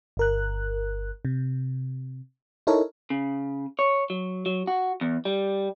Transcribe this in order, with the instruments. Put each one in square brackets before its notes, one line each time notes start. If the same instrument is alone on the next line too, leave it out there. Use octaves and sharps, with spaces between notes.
[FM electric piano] G1 A#4 F#6
C3
D#4 E4 A4 A#4 C#5
[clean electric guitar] C#3
C#5
F#3
F#3
F#4
E2
G3